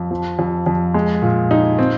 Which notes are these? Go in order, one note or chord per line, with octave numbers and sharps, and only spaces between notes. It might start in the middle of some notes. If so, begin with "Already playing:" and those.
Already playing: F2
F3
F2
F2
G#3
A#2
D#4
C4